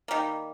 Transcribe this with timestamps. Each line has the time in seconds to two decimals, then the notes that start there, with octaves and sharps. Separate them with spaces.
0.08 D#3 G3 A#3